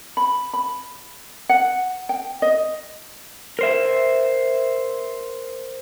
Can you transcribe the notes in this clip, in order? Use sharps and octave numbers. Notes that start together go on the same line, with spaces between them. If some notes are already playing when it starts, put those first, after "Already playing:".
B5
B5
F#5
G5
D#5
A#4 C5 E5